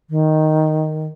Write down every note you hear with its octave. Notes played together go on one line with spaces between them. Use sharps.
D#3